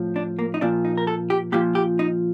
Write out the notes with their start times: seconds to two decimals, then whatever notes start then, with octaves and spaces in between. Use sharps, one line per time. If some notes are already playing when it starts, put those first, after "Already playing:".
Already playing: A2 F3
0.16 D4
0.39 A#3
0.54 D#4
0.61 A#2 F3 D4
0.85 D#4
0.98 A#4
1.07 A4
1.30 G4
1.52 A#2 F3 G4
1.75 G4
1.99 D#4